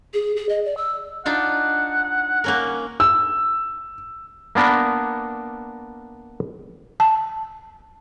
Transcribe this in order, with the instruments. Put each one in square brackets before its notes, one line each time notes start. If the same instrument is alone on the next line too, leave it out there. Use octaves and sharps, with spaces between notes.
[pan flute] G#4
G#4
D#5
D5
E6
[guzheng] D4 D#4 F4 [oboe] F#5
[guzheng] A#3 C#4 A#4
[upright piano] E6
[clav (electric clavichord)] A#3 B3 D4 A#4 B4
[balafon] A5